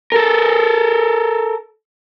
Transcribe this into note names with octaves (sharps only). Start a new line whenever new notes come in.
A4 A#4